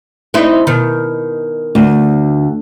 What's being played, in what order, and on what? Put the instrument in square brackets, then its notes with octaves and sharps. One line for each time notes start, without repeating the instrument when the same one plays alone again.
[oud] C4 D#4 E4
B2 D#3
[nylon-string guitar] D2